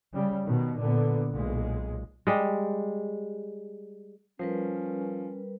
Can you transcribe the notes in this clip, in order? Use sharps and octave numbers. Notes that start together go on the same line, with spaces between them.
C#3 G3
B2 D#3
A#2 D3 B3
B1 A#2 G#3
G3 G#3
F3 G3 C#4 A#4 B4